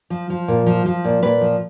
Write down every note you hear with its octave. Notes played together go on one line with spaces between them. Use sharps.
F3
F3
A#2
F3
F3
A#2
A#2 B4
F3